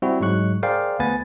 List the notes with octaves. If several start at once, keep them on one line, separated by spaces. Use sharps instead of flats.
G3 C4 E4 F#4
G#2 F#3 G#3 C#6 F#6
G#4 A#4 C5 D5 F5 G5
D2 B3 B4 G#5 A6